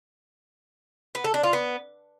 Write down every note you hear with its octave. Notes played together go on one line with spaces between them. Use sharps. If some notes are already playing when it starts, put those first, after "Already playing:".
B3
A4
D4
F4
B3